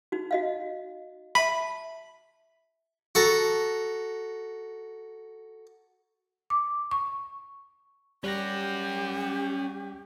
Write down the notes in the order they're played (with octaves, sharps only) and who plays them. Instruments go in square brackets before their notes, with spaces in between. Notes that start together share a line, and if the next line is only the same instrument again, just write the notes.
[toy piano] D#4 F#4
F#4 D#5 F5
[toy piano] E5 A5 [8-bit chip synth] B5
[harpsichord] F#4 A4 A#5
[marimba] D6
C#6
[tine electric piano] G3 A#6 [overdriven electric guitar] C#4 F#5 [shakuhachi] G4